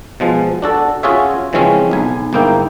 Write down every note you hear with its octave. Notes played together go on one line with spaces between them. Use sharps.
B2 F3 G#3
D4 F#4 A4
C#4 F4 F#4 G#4 C#5 E5
C#3 E3 F3 G#3 C4 C#4
B1 G#5
G1 G#2 A#3 D#4 E4 G5